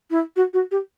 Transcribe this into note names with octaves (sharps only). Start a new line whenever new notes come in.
E4
F#4
F#4
G4